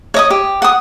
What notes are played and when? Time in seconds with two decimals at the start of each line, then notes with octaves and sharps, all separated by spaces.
0.14 C#5 D#5 D#6
0.30 G4
0.62 F#5 D#6